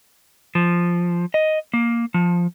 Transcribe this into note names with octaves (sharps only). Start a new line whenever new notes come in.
F3
D#5
A#3
F3